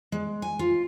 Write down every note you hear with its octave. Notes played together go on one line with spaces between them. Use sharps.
G#3
G#5
F4